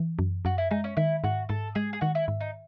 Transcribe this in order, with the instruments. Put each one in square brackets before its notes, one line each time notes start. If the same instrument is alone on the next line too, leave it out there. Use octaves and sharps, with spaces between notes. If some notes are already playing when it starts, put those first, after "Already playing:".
Already playing: [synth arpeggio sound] E3
F#2
[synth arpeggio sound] F#2 [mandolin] F#4
[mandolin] E4
[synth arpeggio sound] G#3 [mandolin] D#4
[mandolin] C#4
[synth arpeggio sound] D#3 [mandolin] E4
[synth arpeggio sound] G#2 [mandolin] F#4
[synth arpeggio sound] G#2 [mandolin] A4
[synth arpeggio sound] G#3 [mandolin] G#4
[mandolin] G#4
[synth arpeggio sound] D#3 [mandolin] F#4
[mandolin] E4
[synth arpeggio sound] G#2
[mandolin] D#4